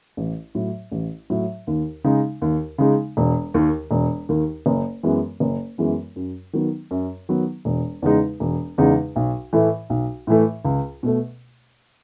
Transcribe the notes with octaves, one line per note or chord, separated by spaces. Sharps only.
A1
A2 F#3
A1
A2 F#3
D#2
C#3 G#3 D#4
D#2
C#3 G#3 D#4
E1
D#2 D#3
E1
D#2 D#3
F#1
F#2 E3 G#3 B3
F#1
F#2 E3 G#3 B3
F#2
D#3 F#3 B3
F#2
D#3 F#3 B3
E1
E2 C#3 G#3 D#4
E1
E2 C#3 G#3 D#4
B1
A2 E3 A3
B1
A2 E3 A3
C#2
B2 A3